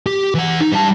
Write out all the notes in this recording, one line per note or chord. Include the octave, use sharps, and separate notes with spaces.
G4
E3 F#5
D#4
G3 A5